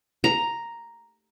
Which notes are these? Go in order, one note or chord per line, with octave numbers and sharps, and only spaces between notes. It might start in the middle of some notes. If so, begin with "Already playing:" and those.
A#5